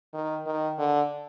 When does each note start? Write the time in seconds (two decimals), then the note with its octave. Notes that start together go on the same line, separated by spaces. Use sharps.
0.14 D#3
0.46 D#3
0.79 D3